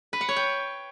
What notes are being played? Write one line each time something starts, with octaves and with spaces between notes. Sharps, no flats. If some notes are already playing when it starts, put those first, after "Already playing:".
B4
F#5
C#5
G5